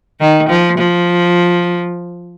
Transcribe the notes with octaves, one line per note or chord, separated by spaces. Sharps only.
D#3
F3
F3